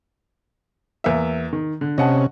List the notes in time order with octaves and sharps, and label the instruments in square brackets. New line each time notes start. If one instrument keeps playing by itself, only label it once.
[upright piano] E2 A#3 E5
D#3
D3
[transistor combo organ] C3 C#4 [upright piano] D#5 F#5 A5